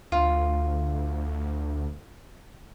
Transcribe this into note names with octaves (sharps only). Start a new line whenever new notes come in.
D2 F4